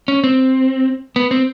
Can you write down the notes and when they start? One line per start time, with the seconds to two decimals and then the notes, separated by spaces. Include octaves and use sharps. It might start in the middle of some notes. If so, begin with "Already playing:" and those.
0.08 C#4
0.24 C4
1.16 B3
1.31 C4